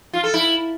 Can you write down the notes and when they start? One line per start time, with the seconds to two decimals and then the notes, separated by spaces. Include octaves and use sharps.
0.13 F4
0.24 A4
0.34 E4